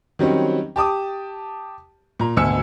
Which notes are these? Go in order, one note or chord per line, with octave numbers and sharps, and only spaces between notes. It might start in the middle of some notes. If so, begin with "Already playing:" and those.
D#3 F#3 G3 C4 C#4
G4 A5 D6 D#6
A#2 A#5
G#1 D2 B2 G#5 E6 C#7